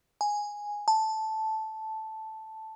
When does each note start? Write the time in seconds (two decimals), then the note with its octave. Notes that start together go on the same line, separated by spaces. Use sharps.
0.21 G#5
0.88 A5